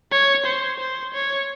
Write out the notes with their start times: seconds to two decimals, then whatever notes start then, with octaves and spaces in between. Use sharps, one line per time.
0.11 C#5
0.46 C5
0.80 C5
1.14 C#5